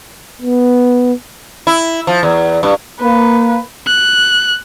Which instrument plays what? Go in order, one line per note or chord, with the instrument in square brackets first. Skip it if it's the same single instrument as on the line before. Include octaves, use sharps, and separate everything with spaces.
[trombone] B3
[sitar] E4
F3
E2
G2
[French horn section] A#3 [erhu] B4
[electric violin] F#6